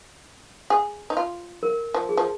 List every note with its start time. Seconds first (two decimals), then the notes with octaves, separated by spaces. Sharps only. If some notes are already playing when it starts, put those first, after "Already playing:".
0.70 G#4
1.10 D#4
1.17 F4
1.63 A#4
1.94 F3
2.09 G#4
2.17 F3